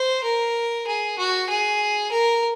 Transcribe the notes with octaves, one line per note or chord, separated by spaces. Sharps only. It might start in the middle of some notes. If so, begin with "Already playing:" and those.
Already playing: C5
A#4
G#4
F#4
G#4
A#4